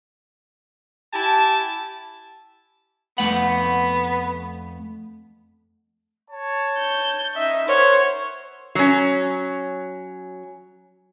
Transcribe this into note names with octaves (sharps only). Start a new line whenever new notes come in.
E4 G4 G#5 A5
F2 A3 B3 F#5
C#5 A5
G6
C#4 D#4 D#5 E5
A#4 C5 C#5 F#5
F#3 C#4